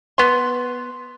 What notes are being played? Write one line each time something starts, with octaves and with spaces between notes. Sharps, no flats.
B3 C6